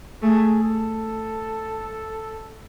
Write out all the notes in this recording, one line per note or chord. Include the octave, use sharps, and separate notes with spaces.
A3 G#4
A4